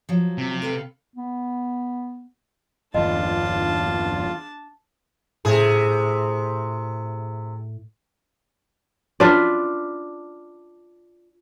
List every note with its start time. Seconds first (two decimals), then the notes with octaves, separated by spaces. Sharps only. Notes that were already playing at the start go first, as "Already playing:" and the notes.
0.09 F3 F#3
0.38 C3
0.62 A4 B4 F5
1.16 B3
2.94 G1 E2 D4 F4 D#5 A5
5.45 A2 C3 G#4
9.20 D4 F4 B4 D5